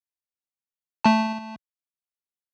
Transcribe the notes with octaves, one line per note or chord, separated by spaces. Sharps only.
A3 A5